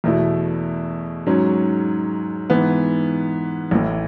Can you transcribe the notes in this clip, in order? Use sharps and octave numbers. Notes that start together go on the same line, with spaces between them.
E2 B2 A3 E4
G#2 F#3 C#4
G#2 E3 B3
A1 A2 E3